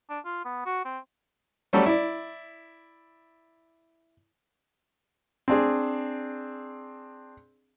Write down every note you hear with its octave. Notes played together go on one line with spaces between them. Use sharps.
D4
F4
B3
F#4
C4
F#3 G3 A3 C#4 A4 D5
E4 D5
C4 D4 G#4